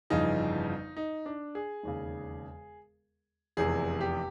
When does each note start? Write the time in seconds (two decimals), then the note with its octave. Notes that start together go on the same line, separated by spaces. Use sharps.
0.10 G1 F2 C#3 E3 D#4
0.97 D#4
1.26 D4
1.55 G#4
1.83 E1 D#2 C#3
3.57 F1 E2 C3 G#4
4.01 G4